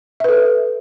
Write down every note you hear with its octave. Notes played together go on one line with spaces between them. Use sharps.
A4 B4 E5